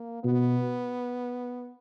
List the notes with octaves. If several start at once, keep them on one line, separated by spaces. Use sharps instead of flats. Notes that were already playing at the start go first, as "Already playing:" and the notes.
Already playing: A#3
B2 B3